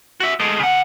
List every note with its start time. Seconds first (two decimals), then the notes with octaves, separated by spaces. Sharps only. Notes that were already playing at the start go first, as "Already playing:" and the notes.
0.20 F#4 E5
0.40 G#3 A3
0.59 C#3 F#5